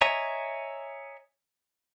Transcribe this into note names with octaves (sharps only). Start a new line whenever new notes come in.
C#5 D#5 E5 G#5 A#5